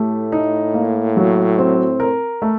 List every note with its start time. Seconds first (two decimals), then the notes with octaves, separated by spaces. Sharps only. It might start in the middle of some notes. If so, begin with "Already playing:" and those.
Already playing: A2 A3 G4
0.32 D#4
0.74 A#3
1.17 F#3
1.58 C4
2.00 A#4
2.42 A3